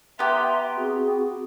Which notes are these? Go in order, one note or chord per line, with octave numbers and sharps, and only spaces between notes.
B3 G4 E5 A#5 C6
C4 F#4 G#4